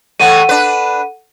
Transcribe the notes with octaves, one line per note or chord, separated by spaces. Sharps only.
A2 E3 A3 A4 F#5 D#7
D4 B4